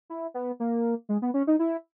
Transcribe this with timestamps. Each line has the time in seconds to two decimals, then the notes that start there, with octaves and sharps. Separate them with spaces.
0.10 E4
0.34 B3
0.60 A#3
1.09 G#3
1.22 B3
1.34 C#4
1.47 D#4
1.59 E4